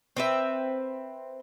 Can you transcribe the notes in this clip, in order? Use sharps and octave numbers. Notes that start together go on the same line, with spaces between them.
C4 B4 E5